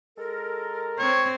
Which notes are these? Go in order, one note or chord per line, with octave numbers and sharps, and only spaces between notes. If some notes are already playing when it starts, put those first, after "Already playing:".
G#3 A4 A#4
C4 C#5